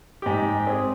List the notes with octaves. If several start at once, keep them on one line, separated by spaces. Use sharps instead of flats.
G#2 G4
C4 G#4